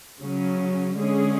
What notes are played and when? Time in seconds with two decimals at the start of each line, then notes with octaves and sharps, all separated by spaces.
0.21 C#3 F#3 C#4
0.97 D3 G#3 C#4 G#4